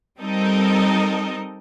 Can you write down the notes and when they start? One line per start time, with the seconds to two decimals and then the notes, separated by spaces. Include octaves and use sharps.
0.19 G3 C4 D#4 A4 A#4 D#5